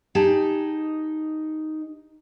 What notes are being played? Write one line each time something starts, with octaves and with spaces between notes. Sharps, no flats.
D#4 G4 G#4 A5